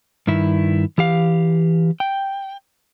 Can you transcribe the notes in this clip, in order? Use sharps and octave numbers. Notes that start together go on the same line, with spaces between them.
G2 D#3 E4
E3 G4 F5
G5